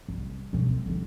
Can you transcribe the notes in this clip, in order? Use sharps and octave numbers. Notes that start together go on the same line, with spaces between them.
C2
B2 G#3
C4
D3 D#3